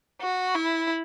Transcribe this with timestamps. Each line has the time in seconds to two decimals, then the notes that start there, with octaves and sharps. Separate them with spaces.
0.21 F#4
0.55 E4